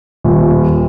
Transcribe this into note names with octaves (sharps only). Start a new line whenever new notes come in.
D#1